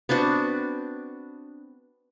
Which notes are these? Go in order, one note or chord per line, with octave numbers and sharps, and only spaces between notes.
B3 C4 D4 F#4